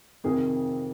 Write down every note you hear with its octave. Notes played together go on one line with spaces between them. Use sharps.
F2 C3 D#3 G#4